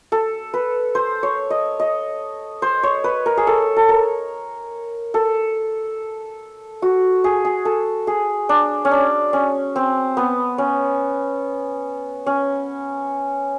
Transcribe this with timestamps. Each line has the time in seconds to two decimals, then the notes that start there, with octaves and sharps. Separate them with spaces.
0.12 A4
0.54 B4
0.95 C5
1.23 C#5
1.50 D#5
1.80 D#5
2.62 C5
2.83 C#5
3.04 B4
3.26 A#4
3.37 G#4
3.47 A4
3.76 A4
3.89 A#4
5.14 A4
6.82 F#4
7.24 G#4
7.45 G#4
7.65 A4
8.07 G#4
8.49 D4
8.85 C#4
8.91 D4
9.33 C#4
9.76 C4
10.17 B3
10.58 C#4
12.26 C#4